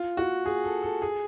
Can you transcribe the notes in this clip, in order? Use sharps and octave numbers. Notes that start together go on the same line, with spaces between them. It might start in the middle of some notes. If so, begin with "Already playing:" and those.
Already playing: F4
F#4
G#4
A4
A4
G#4